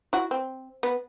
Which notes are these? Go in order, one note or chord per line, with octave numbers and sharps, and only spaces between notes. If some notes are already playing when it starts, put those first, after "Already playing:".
E4 F#4
C4
B3